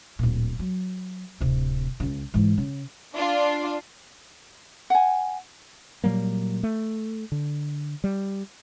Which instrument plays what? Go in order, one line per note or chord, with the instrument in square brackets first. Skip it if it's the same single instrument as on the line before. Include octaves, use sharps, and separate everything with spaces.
[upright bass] D1 A#2
F#3
D1 C3
C#2 C#3
G#2 E3
C#3
[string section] D4 F4
[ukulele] F#5 G#5
[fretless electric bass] A#2 F#3 G3 A#3
A3
D3
G3